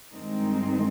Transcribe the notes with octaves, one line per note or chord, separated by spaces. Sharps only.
G2 D#3 G#3 C4 D#4